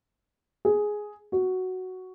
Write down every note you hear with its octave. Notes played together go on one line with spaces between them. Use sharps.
G#4
F#4